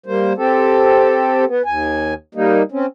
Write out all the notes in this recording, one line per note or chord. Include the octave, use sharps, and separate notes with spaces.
G3 A#3 C5
C4 G4 A4
B3
D#2 G#5
G3 A#3 D#4
C4 C#4